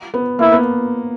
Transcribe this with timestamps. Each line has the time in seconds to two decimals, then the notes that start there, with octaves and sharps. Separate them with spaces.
0.14 B3
0.39 A#3 E4
0.52 B3